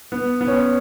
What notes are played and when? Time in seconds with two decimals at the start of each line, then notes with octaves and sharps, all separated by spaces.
0.12 B3
0.41 B3
0.47 C#4